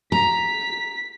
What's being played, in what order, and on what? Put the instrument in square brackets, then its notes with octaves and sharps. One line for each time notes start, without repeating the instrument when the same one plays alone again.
[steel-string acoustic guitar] A#5 [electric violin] B6